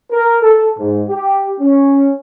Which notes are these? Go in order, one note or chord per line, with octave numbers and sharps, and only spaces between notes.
A#4
A4
G#2
G4
C#4